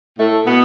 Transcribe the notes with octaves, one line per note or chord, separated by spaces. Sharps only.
A2 A3
B2 B3